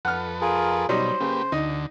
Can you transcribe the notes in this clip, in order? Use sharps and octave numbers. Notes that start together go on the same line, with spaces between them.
F2 A4 B4 F#5 F6
F4 G#4 A#4
B2 F#3 G3 D#4 C5
C#3 A#3 G4 B4
D2 D3 D#4